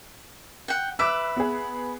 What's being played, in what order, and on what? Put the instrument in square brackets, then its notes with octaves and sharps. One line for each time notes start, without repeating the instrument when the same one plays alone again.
[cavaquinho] F#5 G5
[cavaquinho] B4 E5 D6 [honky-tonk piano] E6 F#6
[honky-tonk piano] B3 G#4